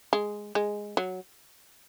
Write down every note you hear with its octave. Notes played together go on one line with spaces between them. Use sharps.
G#3
G#3
F#3